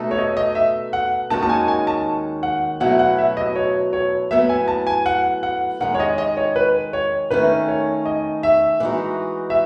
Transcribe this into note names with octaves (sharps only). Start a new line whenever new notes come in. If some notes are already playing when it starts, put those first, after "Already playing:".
Already playing: B2 A3 D#4 A4
C#5
D#5
D#5
E5
F#5
D#2 D#3 G#3 C#4 F#4 A5
A5
G#5
G#5
A5
F#5
B2 F#3 A3 E4 F#5
F#5
E5
D#5
C#5
C#5
A2 F#3 B3 E5
G#5
A5
G#5
F#5
F#5
D#3 G#3 C#4 F#5
C#5
D#5
D#5
C#5
B4
C#5
D#3 A3 C#4 B4
C#5
D#5
E5
E3 G#3 B3 D#4 F#4
E5